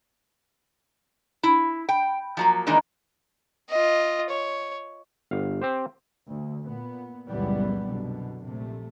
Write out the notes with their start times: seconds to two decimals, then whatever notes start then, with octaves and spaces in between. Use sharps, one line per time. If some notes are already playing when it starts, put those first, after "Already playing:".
1.43 E4
1.89 G5
2.37 F3 F#3 A#3
2.67 D#3 E3 G#3 A#3 D4
3.70 F4 D#5
4.30 C#5
5.31 G1 F5
5.61 C4 G4 C5
6.27 D2
6.64 A#2 B3
7.27 C#2 F#2 A#2 E3 G3 B3
7.86 C2 F#2 B2 D3
8.44 A#1 C3 A3